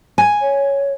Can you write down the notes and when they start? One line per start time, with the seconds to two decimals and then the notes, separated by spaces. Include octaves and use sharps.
0.18 G#5
0.42 C#5